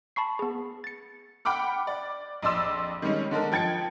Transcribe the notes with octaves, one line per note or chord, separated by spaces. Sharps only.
A5 B5 C#6 C7
B3 G#4
A6 C#7
F#5 G5 B5 D6 F6
D5
A#1 F2 D5 C6 E6 E7
D#3 G3 G#3 C#4 D#4
D3 G#3 D4 A#4
F3 G5 G#6 A6 C#7